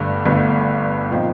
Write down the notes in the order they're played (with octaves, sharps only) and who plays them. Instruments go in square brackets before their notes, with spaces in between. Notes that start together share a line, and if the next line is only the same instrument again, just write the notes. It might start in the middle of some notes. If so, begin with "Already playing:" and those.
Already playing: [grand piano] G1 G2 D3 A3
G1 G2 D3 A3
A#2 F3 C4 D#4